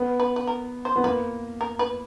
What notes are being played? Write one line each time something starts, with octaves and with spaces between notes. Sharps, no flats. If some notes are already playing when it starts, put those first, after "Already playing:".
Already playing: B3
B4
B4
A#4
C5
B3
A#3 B4
A#4
B4